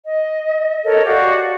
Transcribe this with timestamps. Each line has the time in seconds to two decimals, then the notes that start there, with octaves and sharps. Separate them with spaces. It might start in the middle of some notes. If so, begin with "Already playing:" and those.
0.05 D#5
0.84 A4 A#4 C#5 D#5
1.06 F#4 G4 D5 F5